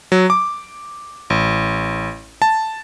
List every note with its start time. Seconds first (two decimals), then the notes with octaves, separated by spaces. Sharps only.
0.12 F#3
0.30 D6
1.30 A1
2.42 A5